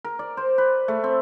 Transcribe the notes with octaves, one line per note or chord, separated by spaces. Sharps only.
A#4
D5
C5
B4
A3
C4